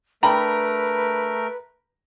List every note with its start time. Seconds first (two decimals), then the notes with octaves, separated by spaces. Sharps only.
0.23 A3 D4 A#4 B4 G5 A#5 B5